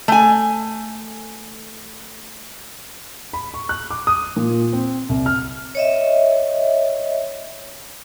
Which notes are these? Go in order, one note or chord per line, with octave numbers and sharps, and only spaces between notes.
A3 G#5
B5
C#6
F#6
D6
D#6
A#2
C4
C2
F6
C#5 D#5 E5